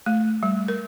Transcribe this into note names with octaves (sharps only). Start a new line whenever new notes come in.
A3
G3
A#4